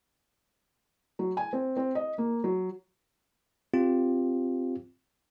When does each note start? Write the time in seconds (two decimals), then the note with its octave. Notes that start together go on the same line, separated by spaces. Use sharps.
1.19 F#3
1.37 G#5
1.53 C4
1.77 C4
1.95 D#5
2.18 A#3
2.44 F#3
3.74 C4 F4 G4